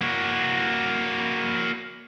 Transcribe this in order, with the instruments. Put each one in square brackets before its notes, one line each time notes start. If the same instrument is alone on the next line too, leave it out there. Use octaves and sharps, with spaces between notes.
[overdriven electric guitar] A#3 F#4